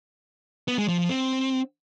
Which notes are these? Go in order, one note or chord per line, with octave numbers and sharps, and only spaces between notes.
B3
G#3
F3
F3
C4